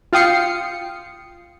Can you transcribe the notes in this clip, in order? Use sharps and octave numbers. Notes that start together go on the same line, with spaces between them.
F4 F5 G5 D#6 C7 C#7